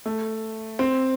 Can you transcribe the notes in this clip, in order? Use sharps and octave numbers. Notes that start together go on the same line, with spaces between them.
A3
C4